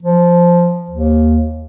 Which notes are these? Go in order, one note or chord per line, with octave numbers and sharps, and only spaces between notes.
F3
D#2